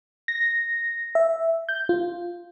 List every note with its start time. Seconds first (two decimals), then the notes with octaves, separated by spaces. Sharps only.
0.28 A#6
1.15 E5
1.69 G6
1.89 F4